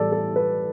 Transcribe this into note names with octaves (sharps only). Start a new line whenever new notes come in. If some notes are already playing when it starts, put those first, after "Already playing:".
Already playing: A2 E3 G3 A4 D5
A4
B4